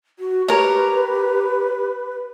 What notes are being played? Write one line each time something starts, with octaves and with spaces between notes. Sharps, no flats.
F#4
G4 A#4 B4 C#5